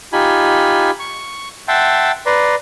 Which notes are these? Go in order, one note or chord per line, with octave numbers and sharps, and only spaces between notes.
D#4 F4 G4 G#5 B5
C#6
E5 F#5 G5 A5 C6
B4 D5 A#5 C6